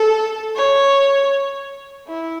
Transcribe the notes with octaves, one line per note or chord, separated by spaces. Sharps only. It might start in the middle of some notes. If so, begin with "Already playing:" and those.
Already playing: A4
C#5
E4